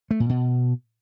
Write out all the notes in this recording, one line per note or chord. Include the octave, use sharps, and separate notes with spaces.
A3
A#2
B2